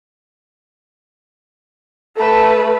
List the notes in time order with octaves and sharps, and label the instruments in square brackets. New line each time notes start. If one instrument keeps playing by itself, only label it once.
[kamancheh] A3 B4 [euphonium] A4